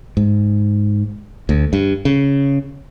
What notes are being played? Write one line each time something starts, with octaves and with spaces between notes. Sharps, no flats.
G#2
D2
G2
C#3